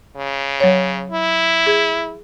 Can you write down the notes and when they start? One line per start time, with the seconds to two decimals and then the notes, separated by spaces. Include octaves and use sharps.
0.17 C#3
0.60 F#3 C#5
1.11 E4
1.67 G#4